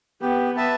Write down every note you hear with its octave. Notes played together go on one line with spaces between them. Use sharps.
B3 G4
B4 E5 A5